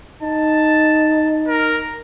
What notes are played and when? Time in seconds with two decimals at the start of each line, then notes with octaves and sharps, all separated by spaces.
0.22 D#4 A5
1.48 A#4